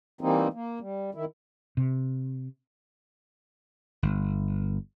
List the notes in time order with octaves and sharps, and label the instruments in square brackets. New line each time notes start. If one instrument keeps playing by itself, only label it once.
[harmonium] E3 G3 A#3 C4 D#4
A#3
G3
D#3 E4
[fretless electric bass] C3
[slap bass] G1